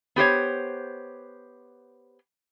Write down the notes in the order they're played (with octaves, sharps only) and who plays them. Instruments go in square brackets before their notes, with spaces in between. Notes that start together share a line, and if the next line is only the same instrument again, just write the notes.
[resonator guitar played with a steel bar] B3 G4 C5 C#5